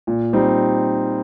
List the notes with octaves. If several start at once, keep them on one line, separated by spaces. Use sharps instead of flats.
A#2
G3 C4 D#4